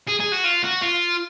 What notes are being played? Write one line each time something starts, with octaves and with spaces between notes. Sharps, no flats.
G#4
G#4
F#4
F4
F#4
F4